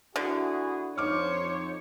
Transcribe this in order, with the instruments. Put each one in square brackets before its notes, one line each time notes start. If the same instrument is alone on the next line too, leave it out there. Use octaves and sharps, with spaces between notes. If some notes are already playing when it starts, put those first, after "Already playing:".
[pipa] D3 [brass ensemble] E4 F#4 G#4
[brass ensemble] F2 F3 C5 [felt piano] D#4 D6 F6 [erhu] C#5